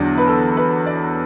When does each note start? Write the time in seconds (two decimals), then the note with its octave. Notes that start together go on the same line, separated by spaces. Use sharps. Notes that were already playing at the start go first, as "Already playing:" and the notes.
Already playing: E2 D3 F#3 D5
0.18 B4
0.27 A4
0.57 B4
0.86 D5